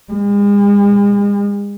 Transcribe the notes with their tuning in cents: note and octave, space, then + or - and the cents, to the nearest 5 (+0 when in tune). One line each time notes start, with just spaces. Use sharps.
G#3 -40